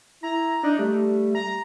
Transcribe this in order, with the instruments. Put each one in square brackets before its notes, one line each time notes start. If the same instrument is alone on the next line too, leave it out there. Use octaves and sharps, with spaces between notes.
[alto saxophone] E4 [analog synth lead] A#5
[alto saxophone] D4 [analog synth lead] D#4
[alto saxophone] G3 [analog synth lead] A3
[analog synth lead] A#5